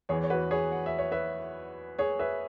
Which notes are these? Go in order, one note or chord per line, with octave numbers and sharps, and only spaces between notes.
E2 E3 G#4 C#5
C#5
F#4 B4
G#4 C#5
F#5
E5
C#5
B4 E5
G#4 C#5
B4 E5